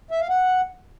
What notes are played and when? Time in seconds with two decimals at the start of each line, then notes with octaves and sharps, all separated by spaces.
0.11 E5
0.20 F5
0.29 F#5